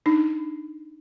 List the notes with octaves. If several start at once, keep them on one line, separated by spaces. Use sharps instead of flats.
D4 D#4